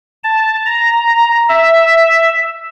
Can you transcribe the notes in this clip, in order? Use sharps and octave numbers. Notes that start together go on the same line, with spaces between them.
A5
A#5
E5